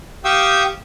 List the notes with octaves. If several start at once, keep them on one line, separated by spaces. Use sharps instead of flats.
G4 F5 G5 C#6 D#6 E6